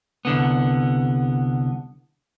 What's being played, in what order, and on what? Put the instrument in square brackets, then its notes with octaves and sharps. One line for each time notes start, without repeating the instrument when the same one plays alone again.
[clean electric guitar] C2 D3 B3